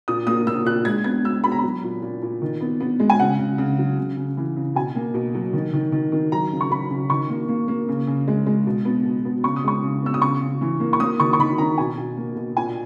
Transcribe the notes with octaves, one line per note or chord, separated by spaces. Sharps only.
A#2 D#6
A#3 D#6
A#3 E6
A#2 F#6
G#3 G#6
B3 G#6
G#3 E6
B3 B5
A#5
B5
F#3
A#2
A#2
A#2
D#3
B3
B3
G#3
G#5
C#3 F#5
C#3
C#3
F#3
C#3
C#3
E3
C#3
B2 G#5
A#3
B2
F#3
D#3
D#3
D#3
D#3
F#3 A#5
C#3
C#6
F#3 B5
C#3
D#3 C#6
A#3
A#3
A#3
C#3
C#3
G#3
G#3
B2
B3
B2
B3
C#3 C#6
D#6
G#3 C#6
C#3
B3 E6
D#6
C#3 C#6
C#3
E3
A#3
C#6
A#3 D#6
D#3 C#6
C#6
D#3 B5
D#3 A#5
B2 G#5
B2
A#3
B2
A#2 G#5